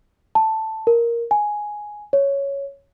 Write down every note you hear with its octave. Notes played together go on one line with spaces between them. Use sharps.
A5
A#4
G#5
C#5